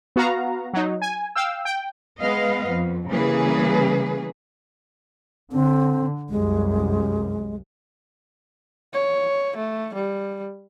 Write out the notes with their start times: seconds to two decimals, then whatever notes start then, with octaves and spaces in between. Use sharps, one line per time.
0.16 B3 F#4 F5 A#5
0.74 F#3 D#4
1.02 G#5
1.36 F5 G5 E6
1.65 G5
2.20 G#3 B3 B4 D#5 F5
2.69 F2
3.09 C#3 E3 G3 A#3 G#4 B4
5.52 D3 C4
6.30 C2 F#2 G#3
8.93 C#5
9.56 A3
9.94 G3